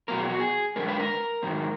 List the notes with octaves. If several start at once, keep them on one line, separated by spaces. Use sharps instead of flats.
B2 F#3 B3 A#4
G#4
F#4
G#4
F#2 D3 G#3 A#4
B4
A#4
G#2 D#3 F#3